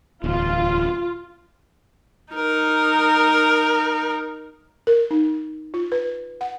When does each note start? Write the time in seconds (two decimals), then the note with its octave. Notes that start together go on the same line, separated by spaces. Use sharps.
0.24 D1 E2 F4
2.33 D#4 A#4
4.87 A#4
5.11 D#4
5.74 F4
5.92 B4
6.41 F#5